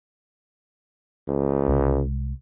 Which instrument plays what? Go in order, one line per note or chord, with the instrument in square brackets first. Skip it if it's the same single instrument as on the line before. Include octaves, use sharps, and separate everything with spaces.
[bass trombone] C#2
[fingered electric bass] C2 G#3